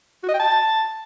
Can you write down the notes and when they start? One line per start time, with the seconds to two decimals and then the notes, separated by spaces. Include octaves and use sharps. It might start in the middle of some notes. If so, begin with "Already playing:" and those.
0.23 F#4
0.28 D#5
0.34 G5
0.39 A5